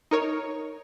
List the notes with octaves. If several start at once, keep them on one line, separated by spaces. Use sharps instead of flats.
D#4 A#4 C#5